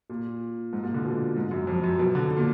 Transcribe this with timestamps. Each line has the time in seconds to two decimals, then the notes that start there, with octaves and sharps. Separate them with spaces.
0.10 A#2
0.73 G#2
0.83 A#2
0.94 D3
1.04 B2
1.36 G#2
1.51 F#2
1.67 F2
1.84 F#2
1.99 B2
2.15 D3
2.30 D3
2.36 A#2